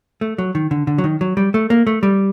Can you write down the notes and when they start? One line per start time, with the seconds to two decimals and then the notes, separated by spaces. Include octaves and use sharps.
0.21 A3
0.38 F#3
0.55 D#3
0.71 D3
0.87 D3
0.98 F#3
1.04 D#3
1.21 F#3
1.37 G3
1.54 A3
1.70 A#3
1.87 A3
2.03 G3